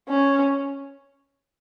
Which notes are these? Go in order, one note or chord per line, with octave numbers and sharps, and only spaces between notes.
C#4